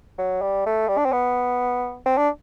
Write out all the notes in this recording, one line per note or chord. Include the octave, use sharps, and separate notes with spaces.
F#3
G3
A3
G3
D4
C4
B3
C4
D4